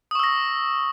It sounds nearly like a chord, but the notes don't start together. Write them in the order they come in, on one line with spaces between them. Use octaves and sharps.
D#6 C#6 E6 A#6